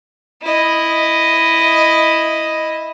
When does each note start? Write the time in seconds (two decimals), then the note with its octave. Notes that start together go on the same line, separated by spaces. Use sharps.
0.43 E4 D#5